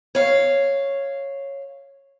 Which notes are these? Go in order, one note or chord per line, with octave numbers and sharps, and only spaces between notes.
C#5 F5